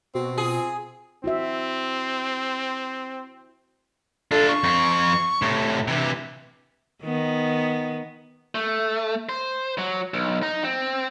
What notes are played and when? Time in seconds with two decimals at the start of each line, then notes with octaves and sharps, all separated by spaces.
0.15 B2 C4 F#4
0.38 F4 G#4
1.24 C4 E4 F#4 E5
4.31 D4 F4 A4
4.48 C#6
4.64 F2 C4
5.42 A2 C3
5.88 C3 E3
7.03 D#3 B3
8.55 A3
9.29 C5
9.78 F#3
10.14 B1
10.43 D#4
10.64 C4